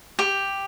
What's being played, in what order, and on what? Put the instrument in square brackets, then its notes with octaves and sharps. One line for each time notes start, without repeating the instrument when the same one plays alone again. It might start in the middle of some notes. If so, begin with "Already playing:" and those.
[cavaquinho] G4